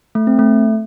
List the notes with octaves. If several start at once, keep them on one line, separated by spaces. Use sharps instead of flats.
A3
C4
A3